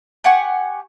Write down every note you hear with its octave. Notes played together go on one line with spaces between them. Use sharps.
G4 F#5 G#5 C#6